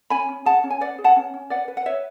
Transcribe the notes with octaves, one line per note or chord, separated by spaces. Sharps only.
C#4 G#5 B5
C#4
G#4 F#5 A5
C#4
G#5
B4 D5 F#5
G#4
F#5 A5
C#4
C#4
B4 D5 F#5
B4
F#5
B4 C#5 E5